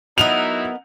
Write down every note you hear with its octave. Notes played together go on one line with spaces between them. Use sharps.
F#3 B3 D#4 E4 A#4 D#5 F7